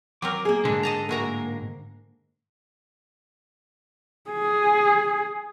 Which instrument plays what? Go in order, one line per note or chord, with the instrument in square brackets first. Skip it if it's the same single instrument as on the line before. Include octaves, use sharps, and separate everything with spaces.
[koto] F#3 C4 A#4 [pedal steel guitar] D6
[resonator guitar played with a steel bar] A#3 G#4
[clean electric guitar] G#2 D3 [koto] G#3 [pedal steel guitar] A4
[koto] D#5 A5 A#5
[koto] A2 F#4 A#5 [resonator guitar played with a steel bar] G#3 A#4 [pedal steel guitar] A#3
[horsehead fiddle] G#4